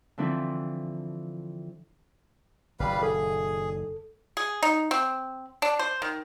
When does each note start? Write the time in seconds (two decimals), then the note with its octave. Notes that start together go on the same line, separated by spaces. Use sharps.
0.18 D3 E3 F3 C4 D4 E4
2.80 F#1 A#2 D#3 G3 B4 F5
3.03 G#4 A4
4.37 G#4
4.63 D#4
4.91 C4
5.62 D4
5.79 C5
6.02 D#3